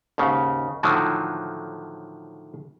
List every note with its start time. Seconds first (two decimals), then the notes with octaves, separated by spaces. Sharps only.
0.18 D#2 G#2 C#3
0.83 A2 D3 D#3 F3 F#3